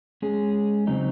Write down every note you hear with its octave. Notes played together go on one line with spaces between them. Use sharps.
G#3 C#4 G#4
C#3 F#3 C4 D#4